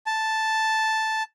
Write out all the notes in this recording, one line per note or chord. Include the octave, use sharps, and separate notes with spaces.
A5